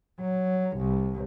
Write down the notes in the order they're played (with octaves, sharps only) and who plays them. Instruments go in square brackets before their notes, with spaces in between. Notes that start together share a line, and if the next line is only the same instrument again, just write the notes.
[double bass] F#3
C2